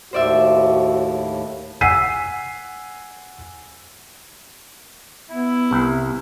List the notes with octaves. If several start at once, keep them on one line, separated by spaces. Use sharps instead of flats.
D#2 A2 F#4 C5 D5 E5
F#5 G#5 E6 B6 C7 D#7
B3 E4
C2